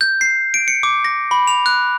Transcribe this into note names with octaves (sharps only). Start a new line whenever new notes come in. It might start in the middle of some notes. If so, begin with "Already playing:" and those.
G6
C7
D7
C#7
D6
A#6
B5
F7
F#6